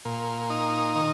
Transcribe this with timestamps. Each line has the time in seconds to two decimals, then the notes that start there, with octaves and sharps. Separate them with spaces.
0.05 A#2
0.50 D#4
0.95 D#3